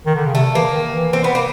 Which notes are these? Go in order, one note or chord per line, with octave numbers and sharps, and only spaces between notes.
D#3
D3
C#3
C3 A3
E3 A#3
D#3
E3
C4
B3
A#3